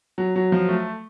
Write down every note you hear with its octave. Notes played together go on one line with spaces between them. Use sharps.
F#3
F#3
F3
A3